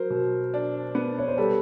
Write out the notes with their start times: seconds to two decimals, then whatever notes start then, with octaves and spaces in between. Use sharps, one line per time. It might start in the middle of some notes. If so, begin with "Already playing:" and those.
Already playing: F#3 A#4 C5
0.10 B2
0.54 D4
0.95 B3
1.18 C#5
1.28 C5
1.37 G3 A4 B4